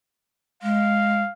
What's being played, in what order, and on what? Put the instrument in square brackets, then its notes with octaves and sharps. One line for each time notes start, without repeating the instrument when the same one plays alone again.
[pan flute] G#3 [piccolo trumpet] F5